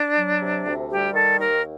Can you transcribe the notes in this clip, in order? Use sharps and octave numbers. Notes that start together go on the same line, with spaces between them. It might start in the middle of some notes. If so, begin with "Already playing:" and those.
Already playing: D4
F#3
C3
D2
G3 G4
D#3 A4
D#2 A#4